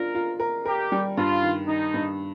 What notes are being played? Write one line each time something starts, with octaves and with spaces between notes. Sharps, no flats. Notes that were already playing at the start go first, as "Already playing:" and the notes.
Already playing: D4 F4 A#4
F4
A#4
G4 A#4
G3
G2 F4
D#3
D#3 D#4
G2